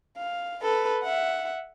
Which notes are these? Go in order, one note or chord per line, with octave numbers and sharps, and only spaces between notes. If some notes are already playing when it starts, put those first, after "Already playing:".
F5
A4 B4
E5 F#5